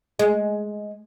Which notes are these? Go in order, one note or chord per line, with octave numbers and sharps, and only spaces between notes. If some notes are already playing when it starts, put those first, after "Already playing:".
G#3